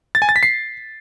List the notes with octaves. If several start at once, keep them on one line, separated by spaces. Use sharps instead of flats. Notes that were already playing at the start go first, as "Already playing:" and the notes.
A6
G#5
A6
B6
C7